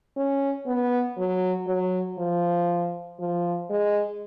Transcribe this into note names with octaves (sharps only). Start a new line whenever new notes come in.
C#4
B3
F#3
F#3
F3
F3
G#3